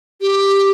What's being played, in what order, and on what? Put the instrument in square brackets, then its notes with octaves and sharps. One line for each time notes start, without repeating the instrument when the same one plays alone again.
[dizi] G4